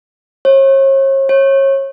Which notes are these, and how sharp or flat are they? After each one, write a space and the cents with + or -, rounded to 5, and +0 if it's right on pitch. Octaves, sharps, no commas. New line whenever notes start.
C#5 -40
C#5 -30